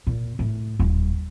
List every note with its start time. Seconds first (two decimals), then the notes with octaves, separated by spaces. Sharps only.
0.07 A#2
0.39 A2
0.79 D#1